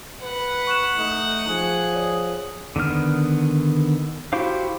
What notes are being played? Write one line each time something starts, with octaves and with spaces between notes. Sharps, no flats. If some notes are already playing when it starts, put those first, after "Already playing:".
B4 F#5
C#6 F#6 E7
A3 D#4
F3 G#4
C#5 D5 D#6
D3 D#3 B3 F6
E4 F#4 G4 C5 F5